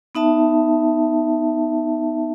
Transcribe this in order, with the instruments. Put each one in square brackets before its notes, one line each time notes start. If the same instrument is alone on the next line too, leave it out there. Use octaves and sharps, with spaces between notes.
[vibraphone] B3 D#4 E5 A5